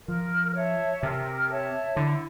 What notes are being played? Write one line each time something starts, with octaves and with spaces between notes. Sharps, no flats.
F3 A#4
C#5 E5 A5
C3 A#4
C#5 E5 A5
D3 E4